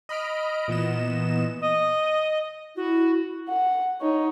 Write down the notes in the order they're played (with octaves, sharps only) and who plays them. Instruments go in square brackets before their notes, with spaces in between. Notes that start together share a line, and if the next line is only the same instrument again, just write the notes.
[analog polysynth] D#5 B5 F6 D7
A#2 E3 B3 D#5 E7
[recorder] D#5
[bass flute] E4 [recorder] F#4
[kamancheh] F#5
D#4 C#5